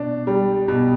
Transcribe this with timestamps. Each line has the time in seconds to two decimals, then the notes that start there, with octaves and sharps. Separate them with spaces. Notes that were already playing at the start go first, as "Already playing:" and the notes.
Already playing: B2 D4
0.27 G3
0.68 B2